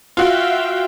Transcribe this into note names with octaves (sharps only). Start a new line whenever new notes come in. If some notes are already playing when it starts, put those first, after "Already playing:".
F4 F#4 E5 F5 G5